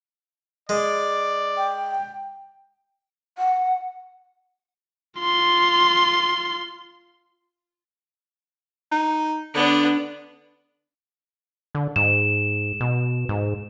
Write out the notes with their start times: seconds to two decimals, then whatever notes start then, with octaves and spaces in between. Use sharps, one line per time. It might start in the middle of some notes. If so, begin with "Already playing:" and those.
0.69 G#3 D5
1.57 G5
3.38 F#5
5.20 F4 C6
8.92 D#4
9.54 D3 B3 D4
11.75 D3
11.96 G#2 E7
12.81 B2
13.29 G#2